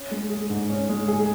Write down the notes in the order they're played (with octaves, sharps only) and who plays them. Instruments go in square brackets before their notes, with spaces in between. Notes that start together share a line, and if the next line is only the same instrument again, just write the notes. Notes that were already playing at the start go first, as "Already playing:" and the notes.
Already playing: [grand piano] C#4
G#3
G#4
G#2
C#4
G#3
G#4